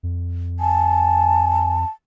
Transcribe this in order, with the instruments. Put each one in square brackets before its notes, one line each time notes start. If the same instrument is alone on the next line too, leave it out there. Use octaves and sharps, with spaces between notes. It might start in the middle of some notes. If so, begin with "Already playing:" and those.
[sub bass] F2
[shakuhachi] G#5 [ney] A5